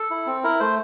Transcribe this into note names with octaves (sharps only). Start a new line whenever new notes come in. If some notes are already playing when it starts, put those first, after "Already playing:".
Already playing: A4
E4
C4
E4 A#4
A3 C5